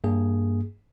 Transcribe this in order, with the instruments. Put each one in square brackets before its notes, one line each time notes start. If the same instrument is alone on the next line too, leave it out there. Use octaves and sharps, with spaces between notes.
[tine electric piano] G2 A#3 G#4